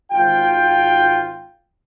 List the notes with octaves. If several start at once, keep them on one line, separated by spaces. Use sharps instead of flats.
G#1 F4 G5